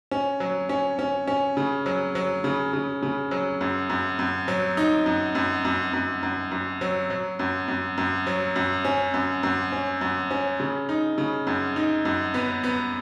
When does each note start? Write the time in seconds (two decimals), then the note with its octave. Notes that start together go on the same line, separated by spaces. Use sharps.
0.11 C#4
0.40 F#3
0.69 C#4
0.99 C#4
1.28 C#4
1.57 C#3
1.86 F#3
2.15 F#3
2.44 C#3
2.73 C#3
3.03 C#3
3.31 F#3
3.61 F#2
3.90 F#2
4.19 F#2
4.48 F#3
4.77 D#4
5.06 F#2
5.35 F#2
5.65 F#2
5.93 F#2
6.23 F#2
6.52 F#2
6.81 F#3
7.10 F#3
7.39 F#2
7.68 F#2
7.98 F#2
8.27 F#3
8.56 F#2
8.85 C#4
9.14 F#2
9.43 F#2
9.72 C#4
10.01 F#2
10.31 C#4
10.60 C#3
10.89 D#4
11.18 C#3
11.47 F#2
11.76 D#4
12.05 F#2
12.34 B3
12.64 B3